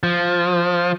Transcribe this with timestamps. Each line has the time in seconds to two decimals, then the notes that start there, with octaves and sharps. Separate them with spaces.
0.03 F3